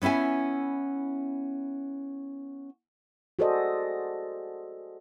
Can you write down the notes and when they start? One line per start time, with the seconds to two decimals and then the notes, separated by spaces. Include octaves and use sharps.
0.02 B3 C#4 E4 E5 G#5
3.39 F#4 G#4 A4 C5 D5 D#5